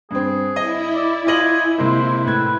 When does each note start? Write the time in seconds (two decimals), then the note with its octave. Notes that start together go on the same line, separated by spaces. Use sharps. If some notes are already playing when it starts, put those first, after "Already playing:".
0.11 G2 C4 G#4
0.56 E4 D#5
0.94 D5
1.27 F4 D#5 G#5 F#7
1.78 C3 G#3 A#3 C5
2.26 A2 B4 G#6